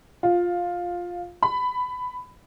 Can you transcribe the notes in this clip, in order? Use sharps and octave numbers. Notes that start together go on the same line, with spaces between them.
F4
B5